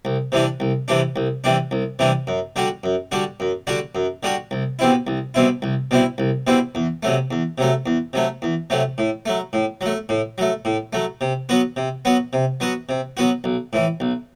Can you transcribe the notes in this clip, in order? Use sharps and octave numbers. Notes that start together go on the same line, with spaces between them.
C2
C3 E3 G3 D4
C2
C3 E3 G3 D4
C2
C3 E3 G3 D4
C2
C3 E3 G3 D4
F#2
D3 G3 D4 F#4
F#2
D3 G3 D4 F#4
F#2
D3 G3 D4 F#4
F#2
D3 G3 D4 F#4
C2
B2 G3 C4 E4
C2
B2 G3 C4 E4
C2
B2 G3 C4 E4
C2
B2 G3 C4 E4
E2
C3 F#3 A3
E2
C3 F#3 A3
E2
C3 F#3 A3
E2
C3 F#3 A3
A2
F#3 A3
A2
F#3 A3
A2
F#3 A3
A2
F#3 A3
C3
F#3 B3 F#4
C3
F#3 B3 F#4
C3
F#3 B3 F#4
C3
F#3 B3 F#4
B1
A2 E3
B1